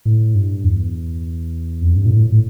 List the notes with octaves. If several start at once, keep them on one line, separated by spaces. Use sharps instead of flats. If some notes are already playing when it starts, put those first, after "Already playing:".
A2
G2
E2
F2
G2
A#2
A2
A2